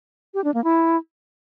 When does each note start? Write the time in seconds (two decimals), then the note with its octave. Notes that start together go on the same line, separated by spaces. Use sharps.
0.34 G4
0.44 D4
0.54 A#3
0.64 E4